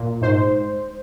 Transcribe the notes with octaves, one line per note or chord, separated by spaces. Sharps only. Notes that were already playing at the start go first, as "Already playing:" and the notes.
Already playing: A#2
G#2 C5